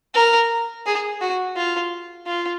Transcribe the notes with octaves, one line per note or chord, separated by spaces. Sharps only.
A#4
G#4
F#4
F4
F4